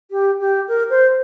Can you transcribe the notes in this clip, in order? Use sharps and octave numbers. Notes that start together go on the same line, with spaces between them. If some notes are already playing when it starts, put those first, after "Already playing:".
G4
G4
A#4
C5